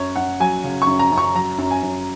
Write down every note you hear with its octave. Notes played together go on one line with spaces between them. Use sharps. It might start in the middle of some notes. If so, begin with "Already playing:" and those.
Already playing: F#2 C#5
F#2 F#5
F#3 G#5
C#3
C#6
F#2
A#5
F#2
C#6
F#3 A#5
F#2
G#5
F#2